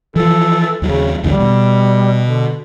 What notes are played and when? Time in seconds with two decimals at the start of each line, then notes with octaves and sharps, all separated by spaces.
0.16 E3 F3 A4
0.82 D#2 C#3 F#3
1.24 A1 D#2 D3 G3
1.40 B2
2.25 D3